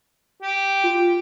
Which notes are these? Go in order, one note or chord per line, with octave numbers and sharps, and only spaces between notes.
G4
F4